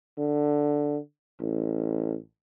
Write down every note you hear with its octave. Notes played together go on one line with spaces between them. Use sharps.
D3
A1